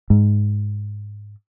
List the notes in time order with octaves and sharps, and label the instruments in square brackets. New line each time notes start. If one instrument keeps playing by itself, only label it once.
[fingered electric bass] G#2